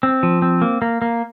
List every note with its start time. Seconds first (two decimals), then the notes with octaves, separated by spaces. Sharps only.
0.03 C4
0.23 F3
0.42 C4
0.62 A#3
0.82 A#3
1.02 A#3